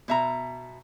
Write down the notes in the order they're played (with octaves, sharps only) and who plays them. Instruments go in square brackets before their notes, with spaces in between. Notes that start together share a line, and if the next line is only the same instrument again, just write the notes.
[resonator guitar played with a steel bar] B2 E5 A#5